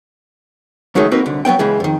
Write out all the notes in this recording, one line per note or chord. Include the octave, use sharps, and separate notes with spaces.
C#2 D#3 F#3 G#3 A3
A#3 C4 D#4 F#4 B4
C2 D3
F#3 B3 C4 G5
C#2 C#3 E3 G#3
F2 D#3